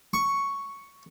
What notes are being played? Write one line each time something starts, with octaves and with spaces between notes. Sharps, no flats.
C#6